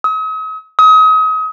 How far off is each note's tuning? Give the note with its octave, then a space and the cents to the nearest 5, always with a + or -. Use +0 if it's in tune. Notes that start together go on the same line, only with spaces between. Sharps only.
D#6 +45
D#6 +35